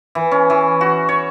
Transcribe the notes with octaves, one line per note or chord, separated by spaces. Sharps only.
E3
C#4
E3
F#4
C#5